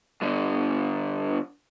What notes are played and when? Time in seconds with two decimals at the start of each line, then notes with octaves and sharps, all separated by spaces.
0.22 G2 D3